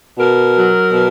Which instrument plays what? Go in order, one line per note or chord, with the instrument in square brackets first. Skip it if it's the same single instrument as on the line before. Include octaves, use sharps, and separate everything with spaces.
[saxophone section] B2 A#4
F#3
B2